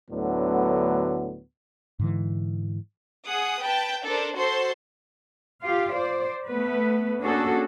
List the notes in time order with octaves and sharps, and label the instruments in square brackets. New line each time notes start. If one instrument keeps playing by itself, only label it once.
[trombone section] D2 A2 D3 F#3 B3
[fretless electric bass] G#2 D3 E3
[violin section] G#4 F#5 D#6
B4 G5 A5
D4 A4 A#4 C5
F#4 A4 C5 C6
[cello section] F4 G4 F5
C5 D5
A3 B3 B4
A#3 C#4 D4 F#4 G#4 A4